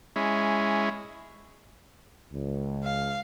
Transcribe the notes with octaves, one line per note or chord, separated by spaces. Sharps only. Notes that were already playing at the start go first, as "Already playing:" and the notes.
G#3 C#4 E4
C#2
F5